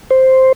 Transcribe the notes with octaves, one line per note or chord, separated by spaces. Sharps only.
C5